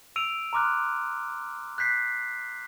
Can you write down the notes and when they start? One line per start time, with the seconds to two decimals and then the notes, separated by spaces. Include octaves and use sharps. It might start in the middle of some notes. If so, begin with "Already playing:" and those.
0.16 E6 D7 D#7 F7
0.53 A#5 C6 D6 F6 F#6
1.78 F#6 G6 B6 C7